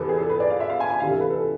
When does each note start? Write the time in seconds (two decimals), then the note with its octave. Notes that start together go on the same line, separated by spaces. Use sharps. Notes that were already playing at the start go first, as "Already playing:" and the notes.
Already playing: E2 C3 E3 A4 B4
0.09 G#4
0.19 A4
0.29 B4
0.40 D5
0.50 F5
0.60 E5
0.70 F5
0.80 G#5
0.90 G#5
1.00 D2 C3 E3 F5
1.10 A4
1.21 B4
1.30 A4